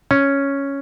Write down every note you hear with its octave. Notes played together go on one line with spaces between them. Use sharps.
C#4